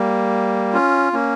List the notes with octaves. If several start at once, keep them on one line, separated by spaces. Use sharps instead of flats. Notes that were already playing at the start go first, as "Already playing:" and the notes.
Already playing: G3 A#3
C#4 F4
A#3 C#4